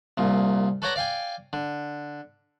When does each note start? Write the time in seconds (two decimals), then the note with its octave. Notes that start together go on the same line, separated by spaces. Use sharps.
0.18 C2 A#2
0.82 A4 B4 C#5 D5 F#5 A#5
0.96 D5 F5 G5 G#5
1.53 D3